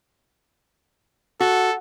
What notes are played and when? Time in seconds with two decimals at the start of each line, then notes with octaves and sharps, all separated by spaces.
1.40 F#4 A4